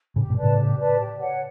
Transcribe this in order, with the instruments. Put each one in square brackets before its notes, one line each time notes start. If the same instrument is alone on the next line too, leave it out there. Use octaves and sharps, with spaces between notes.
[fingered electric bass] A2 C#3 [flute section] G4
[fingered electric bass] G2 B2
[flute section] B4 D5 A5
[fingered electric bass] A2 C#3
[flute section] G4
B4 D5 A5
G4
C#5 F#5